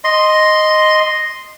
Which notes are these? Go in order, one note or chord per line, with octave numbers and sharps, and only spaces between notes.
D#5 C6